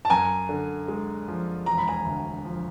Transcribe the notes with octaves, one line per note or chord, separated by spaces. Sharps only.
A5
F#2 G#5 A#5
D3
G#3
F3
E1 A#5
B5
G#5 A#5
D2
F3